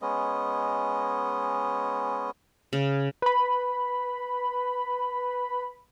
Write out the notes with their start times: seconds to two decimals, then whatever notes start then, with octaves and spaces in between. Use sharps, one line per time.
0.02 G#3 B3 C#4 D#5
2.73 C#3
3.22 B4 B5